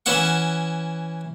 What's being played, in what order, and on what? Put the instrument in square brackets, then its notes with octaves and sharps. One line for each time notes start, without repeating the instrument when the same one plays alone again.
[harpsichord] E3 C#4 E5 F#5 C#6